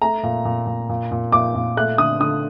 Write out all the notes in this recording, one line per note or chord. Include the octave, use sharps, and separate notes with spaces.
A3 A#5
A#2
A#2
A#2
A#2
A#2
A#2 D6
A#2
A3 F#6
D3 D#6
D3 D#6